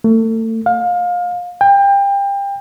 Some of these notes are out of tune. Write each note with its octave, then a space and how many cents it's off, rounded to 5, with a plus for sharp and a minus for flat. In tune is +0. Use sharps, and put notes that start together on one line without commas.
A3 +35
F5 +25
G5 +30